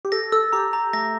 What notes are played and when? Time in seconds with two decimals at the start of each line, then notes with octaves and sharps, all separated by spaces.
0.05 G4
0.12 A4 A#6
0.32 A4 E6
0.53 G4 A#5
0.73 A#5
0.93 A3 A#6